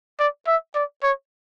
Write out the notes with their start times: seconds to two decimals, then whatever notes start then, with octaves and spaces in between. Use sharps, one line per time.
0.19 D5
0.47 E5
0.75 D5
1.03 C#5